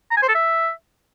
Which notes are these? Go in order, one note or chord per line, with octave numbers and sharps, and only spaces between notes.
A#5
G#5
C5
A4
E5